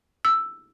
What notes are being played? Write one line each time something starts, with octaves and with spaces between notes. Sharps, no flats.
E6